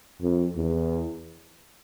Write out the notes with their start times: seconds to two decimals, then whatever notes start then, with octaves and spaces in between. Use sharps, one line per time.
0.22 F2
0.56 E2